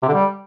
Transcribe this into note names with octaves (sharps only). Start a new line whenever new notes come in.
C3
D3
G3